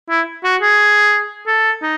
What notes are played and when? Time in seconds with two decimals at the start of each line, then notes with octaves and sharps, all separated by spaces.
0.10 E4
0.44 F#4
0.62 G#4
1.47 A4
1.82 D#4